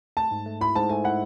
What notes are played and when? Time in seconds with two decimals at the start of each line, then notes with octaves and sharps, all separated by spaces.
0.17 A3 A5
0.31 G#2
0.46 A3
0.61 E4 B5
0.75 G#2 A5
0.89 A3 G#5
1.04 E4 F#5